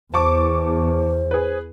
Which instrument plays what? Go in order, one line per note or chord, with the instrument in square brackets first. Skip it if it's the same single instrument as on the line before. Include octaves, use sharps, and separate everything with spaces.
[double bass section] E2 [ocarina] C5 [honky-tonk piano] A5 C#6 D6
[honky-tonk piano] G#4 B4